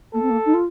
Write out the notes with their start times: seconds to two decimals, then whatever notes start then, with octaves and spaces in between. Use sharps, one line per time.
0.14 A#3 A4
0.22 C4
0.30 A#3
0.46 D#4
0.54 F4